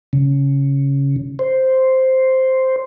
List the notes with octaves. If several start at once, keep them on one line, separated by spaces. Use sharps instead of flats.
C#3
C5